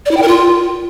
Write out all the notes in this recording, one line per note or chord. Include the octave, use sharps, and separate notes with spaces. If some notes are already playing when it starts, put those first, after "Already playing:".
D5
E4
G5
A#4
F4